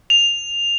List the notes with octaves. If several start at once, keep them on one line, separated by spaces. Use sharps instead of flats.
F7